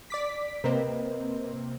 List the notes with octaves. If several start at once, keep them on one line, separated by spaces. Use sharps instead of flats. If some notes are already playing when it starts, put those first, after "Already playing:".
D5 D6 B6
C3 A#3 C4 A#4 B4 D#5